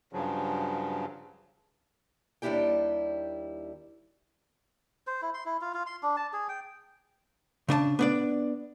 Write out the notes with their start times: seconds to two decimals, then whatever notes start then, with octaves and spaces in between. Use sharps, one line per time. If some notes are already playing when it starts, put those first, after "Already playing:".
0.13 G2 C#3 F3 F#3
2.42 D#2 G3 D4 E4 G4 G5
5.07 C5
5.22 E4
5.34 C6
5.45 E4
5.61 F4
5.74 F4
5.86 C6
6.03 D4
6.17 A5
6.33 G#4
6.49 G5
7.68 C#3 D4 D#5 A5
7.99 B3 D4 D5